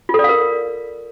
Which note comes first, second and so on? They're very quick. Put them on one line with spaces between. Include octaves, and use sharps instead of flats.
F4 A4 D5 F5 A#4